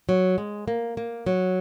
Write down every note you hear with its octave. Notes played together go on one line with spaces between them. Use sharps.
F#3
G#3
A#3
A#3
F#3